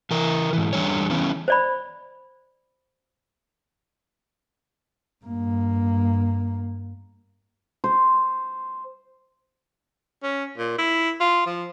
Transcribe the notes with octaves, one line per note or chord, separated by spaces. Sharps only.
E3 A#4
G#2 E3
E2 G3 D4 C#5
E3 B3 C#4
C5 D5 B5
G2 A#3
C5
C#4
A#2
E4
F4
F3